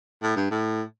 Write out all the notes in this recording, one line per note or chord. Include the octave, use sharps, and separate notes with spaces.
A2
G2
A2